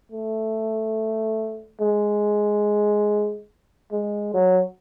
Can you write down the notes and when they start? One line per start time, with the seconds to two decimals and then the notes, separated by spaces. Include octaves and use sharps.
0.12 A3
1.81 G#3
3.92 G#3
4.34 F#3